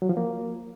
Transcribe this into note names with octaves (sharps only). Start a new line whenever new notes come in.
F#3
F3
A#3